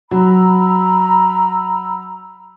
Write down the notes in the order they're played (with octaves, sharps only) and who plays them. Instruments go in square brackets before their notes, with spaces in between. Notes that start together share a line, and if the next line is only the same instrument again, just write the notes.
[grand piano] F#3 [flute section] A#5 B5 E6